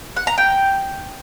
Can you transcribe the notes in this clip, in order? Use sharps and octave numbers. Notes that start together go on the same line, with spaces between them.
F#5
A#5
G5